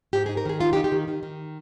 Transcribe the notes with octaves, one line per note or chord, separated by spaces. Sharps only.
G#2 G4
D#4 G#4
A#4
D#3 G#4
D#4 F4
G4
D#4
G4
D#3
D#3
D#3